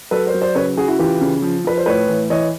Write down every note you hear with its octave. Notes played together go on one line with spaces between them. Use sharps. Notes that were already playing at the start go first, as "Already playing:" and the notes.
F#3 A4 B4
A#4 C5
F#3
C5 D5
C#3 B4 C#5
C#3 F#4 G#4
E4 F#4
E3 F4 G4
C#3
F3
F3 B4
C5
A2 B4 C#5
E3
E3 C#5 D#5